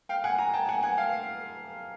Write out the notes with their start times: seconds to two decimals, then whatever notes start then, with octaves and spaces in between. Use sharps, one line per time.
0.09 F5 G5
0.24 F#5 G#5
0.38 G#5 A#5
0.54 G5 A5
0.69 F#5 G#5
0.83 F#5 G#5
0.98 F5 G5